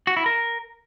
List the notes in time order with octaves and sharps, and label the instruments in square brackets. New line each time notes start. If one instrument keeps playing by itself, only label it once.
[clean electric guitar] F#4
E4
A#4